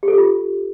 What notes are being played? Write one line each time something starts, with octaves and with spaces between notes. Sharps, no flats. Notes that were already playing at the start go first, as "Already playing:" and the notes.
G4
A4
G4
F4